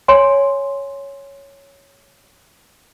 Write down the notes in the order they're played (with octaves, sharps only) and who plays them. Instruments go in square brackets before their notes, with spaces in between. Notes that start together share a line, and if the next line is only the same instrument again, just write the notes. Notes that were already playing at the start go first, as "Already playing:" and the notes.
[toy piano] C#5 G#5 C6